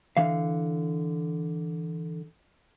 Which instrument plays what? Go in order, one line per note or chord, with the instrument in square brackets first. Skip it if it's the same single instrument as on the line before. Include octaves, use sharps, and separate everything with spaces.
[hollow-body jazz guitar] D3 E3 F5